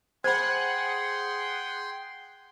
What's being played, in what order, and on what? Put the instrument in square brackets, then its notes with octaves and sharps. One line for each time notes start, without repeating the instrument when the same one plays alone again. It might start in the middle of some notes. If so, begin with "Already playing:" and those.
[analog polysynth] G#4 F#5 [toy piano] C5 B5 [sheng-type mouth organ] G5 C6 [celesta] G#6